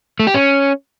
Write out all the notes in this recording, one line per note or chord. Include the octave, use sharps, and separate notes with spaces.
A3
G4
C#4